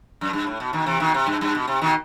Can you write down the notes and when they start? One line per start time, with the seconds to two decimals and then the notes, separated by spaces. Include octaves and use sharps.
0.21 F#2
0.33 G2
0.47 A2
0.60 B2
0.73 B2 D#3
0.86 C3 E3
1.00 B2 D#3
1.14 C3
1.27 G2
1.41 G2
1.55 B2
1.68 C3
1.82 B2 D#3